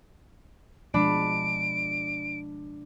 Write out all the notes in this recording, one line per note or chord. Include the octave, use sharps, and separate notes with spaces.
B2 F3 G#3 D4 B5 D7